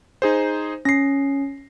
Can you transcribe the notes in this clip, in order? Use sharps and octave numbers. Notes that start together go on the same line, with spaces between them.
D#4 G#4 C5
C#4 A#6 C7